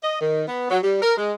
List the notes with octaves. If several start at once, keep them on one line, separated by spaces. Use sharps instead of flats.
D#5
D#3
B3
F#3
G3
A#4
G#3